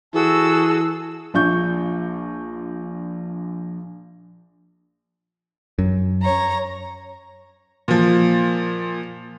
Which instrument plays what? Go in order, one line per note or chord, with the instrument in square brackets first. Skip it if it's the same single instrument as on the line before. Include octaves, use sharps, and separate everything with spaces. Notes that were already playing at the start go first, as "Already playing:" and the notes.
[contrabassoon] E3 [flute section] F#4 G#4 A5 [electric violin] A4 E6
[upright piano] A#1 D4 F4 C#6 G6
[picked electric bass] F#2
[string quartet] C#5 A#5
[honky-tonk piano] A#2 F3